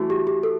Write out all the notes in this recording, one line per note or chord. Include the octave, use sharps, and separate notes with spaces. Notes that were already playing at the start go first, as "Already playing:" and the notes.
Already playing: E3 A3 F#4
G4
G4
A4